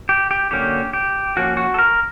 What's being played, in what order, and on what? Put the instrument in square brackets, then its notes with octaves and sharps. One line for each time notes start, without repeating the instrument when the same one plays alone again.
[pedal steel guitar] G4
G4
D3 F#3 A#3 C#4 G4
G4
F3 A#3 C#4 F#4
F#4
A4
A#4